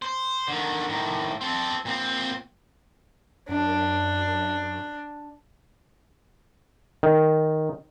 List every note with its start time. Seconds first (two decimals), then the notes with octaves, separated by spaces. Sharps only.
0.02 C5
0.48 D3 D#3
0.89 A2 D#3
1.41 C4 A4
1.85 A#2 C4
3.49 F#2 D4
7.03 D#3